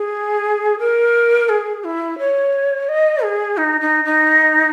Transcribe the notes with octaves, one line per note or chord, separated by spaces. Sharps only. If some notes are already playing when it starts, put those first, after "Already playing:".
Already playing: G#4
A#4
G#4
E4
C#5
D#5
G#4
D#4
D#4
D#4